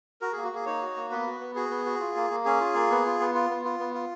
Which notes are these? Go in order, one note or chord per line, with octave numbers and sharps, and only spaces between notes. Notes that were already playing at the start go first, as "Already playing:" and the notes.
F#4 A#4
A#3 G#4
F#4
A#3 G#4
D#4 C#5
F#4
A#3
B3 B4
F#4
B3
F#4 G#4
B3
F#4
F4
A#3
A#3
C#4 G#4
F4
A#3
B3
F4
B3
F4
B3
F4
B3
F4